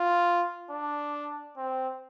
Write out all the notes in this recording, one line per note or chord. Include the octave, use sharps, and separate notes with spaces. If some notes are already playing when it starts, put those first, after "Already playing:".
Already playing: F4
D4
C4